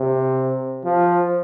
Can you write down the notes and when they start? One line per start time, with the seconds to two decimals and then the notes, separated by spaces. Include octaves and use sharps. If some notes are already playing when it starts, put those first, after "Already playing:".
Already playing: C3
0.84 F3